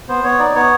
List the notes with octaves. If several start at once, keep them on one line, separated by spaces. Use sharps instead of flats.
B3 C5
B3 C#5
D#4 D5
B3 C#5